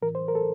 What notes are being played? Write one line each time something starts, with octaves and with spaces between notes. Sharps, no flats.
A2 E3 A#4
C5
A#4
A4